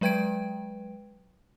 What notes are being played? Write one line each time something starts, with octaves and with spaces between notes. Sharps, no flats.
F#3 G#3 B4 G5 G#6 D7